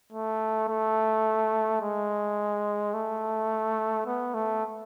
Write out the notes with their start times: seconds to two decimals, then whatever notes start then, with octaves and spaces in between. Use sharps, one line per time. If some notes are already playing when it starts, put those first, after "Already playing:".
0.13 A3
0.68 A3
1.81 G#3
2.94 A3
4.06 B3
4.34 A3